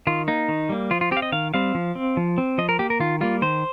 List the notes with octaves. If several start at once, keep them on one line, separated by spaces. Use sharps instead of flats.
D#3 F4
A#3 D#4
D#3
G3 A#3
F3 F4
F4
C4 G4
F5
D#5
D#3 F5
G3 C4 F5
F3
C4
F3
C4
F3 D#5
A#4
A#3 G4
A#4
D#3 F4
G3 A#3 F4
D#3 C5